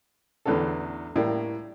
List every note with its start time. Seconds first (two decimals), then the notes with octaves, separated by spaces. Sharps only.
0.46 A1 E2 D3 C#4 A4
1.16 A2 G3 A#3